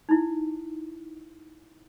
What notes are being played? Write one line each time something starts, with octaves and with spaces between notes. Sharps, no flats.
D#4 E4